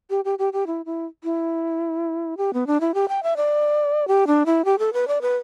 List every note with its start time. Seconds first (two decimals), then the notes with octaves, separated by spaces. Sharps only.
0.10 G4
0.25 G4
0.39 G4
0.53 G4
0.67 E4
0.86 E4
1.24 E4
2.37 G4
2.53 B3
2.67 D4
2.81 E4
2.94 G4
3.09 G5
3.23 E5
3.37 D5
4.08 G4
4.27 D4
4.46 E4
4.65 G4
4.79 A4
4.93 B4
5.08 D5
5.22 B4